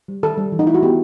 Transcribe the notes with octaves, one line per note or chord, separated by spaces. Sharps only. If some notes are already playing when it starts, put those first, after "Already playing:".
G3
D#3 A4
G3
E3
D#4
A3 E4
F#4
B3 G4